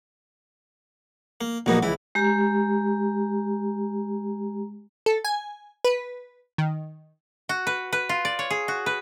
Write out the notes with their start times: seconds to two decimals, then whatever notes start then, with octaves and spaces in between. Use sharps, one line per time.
1.41 A#3
1.66 A#1 F#3 A#3 B3 D#4 F#4
1.83 C#2 E3 E4
2.15 G#3 G4 A#5
5.06 A4
5.25 G#5
5.84 B4
6.58 D#3
7.49 F#4
7.67 B4
7.93 B4
8.09 F4
8.25 D5
8.39 C#5
8.50 G#4
8.68 F#4
8.86 B4